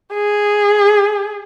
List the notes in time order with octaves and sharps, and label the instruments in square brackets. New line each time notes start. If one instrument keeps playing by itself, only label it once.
[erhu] G#4